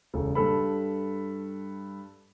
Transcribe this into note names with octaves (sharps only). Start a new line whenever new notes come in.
E1 C#3 A4
G2 A4 B5